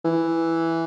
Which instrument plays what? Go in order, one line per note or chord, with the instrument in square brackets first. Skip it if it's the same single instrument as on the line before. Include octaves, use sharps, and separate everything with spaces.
[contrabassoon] E3